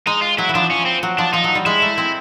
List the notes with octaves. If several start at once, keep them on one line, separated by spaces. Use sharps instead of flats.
G#3 D#4
F4
F#3 E4
E3
F3 D4
C#4
C4
F#3
F3 D4
F3 D#4
F#3
G3
G#3 E4
A3
C4